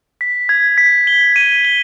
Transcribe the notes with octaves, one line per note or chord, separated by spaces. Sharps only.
B6
G#6
B6
G7
D#7
G7